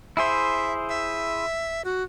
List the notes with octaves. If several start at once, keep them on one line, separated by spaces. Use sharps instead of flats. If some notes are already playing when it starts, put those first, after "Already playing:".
E4 G#4 C5 E5
E5
F#4